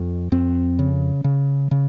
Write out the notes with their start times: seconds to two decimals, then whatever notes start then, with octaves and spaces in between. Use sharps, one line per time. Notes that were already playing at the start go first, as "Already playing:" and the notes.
Already playing: F2
0.32 F2 C4
0.79 C#3
1.24 C#3
1.71 C#3